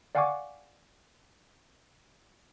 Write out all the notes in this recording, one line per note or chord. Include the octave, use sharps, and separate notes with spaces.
D5 F5 F#5 G#5 C#6 D6